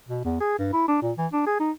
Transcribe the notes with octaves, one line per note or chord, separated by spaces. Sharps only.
B2
E2
G#4
G2
E4
D4
A#2
E3
D4
G#4
D#4